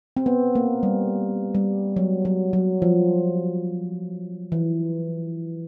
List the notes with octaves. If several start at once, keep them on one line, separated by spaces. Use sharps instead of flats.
C4
B3
A#3
G3
G3
F#3
F#3
F#3
F3
E3